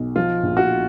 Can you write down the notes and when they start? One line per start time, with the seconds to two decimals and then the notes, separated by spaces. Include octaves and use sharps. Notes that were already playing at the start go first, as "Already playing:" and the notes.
Already playing: B1
0.16 F3 F4
0.43 A#1
0.57 F#4